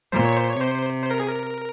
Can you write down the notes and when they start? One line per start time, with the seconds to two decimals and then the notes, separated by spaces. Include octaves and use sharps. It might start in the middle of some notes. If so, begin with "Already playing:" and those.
0.12 A#2 C5
0.25 C#5
0.37 C5
0.49 C#5
0.58 C3 C5
1.02 C5
1.11 A#4
1.20 G#4
1.28 A#4